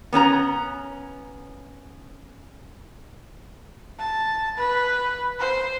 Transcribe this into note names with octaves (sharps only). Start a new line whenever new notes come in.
B3 C#4 A4 A#5
A5
B4
C5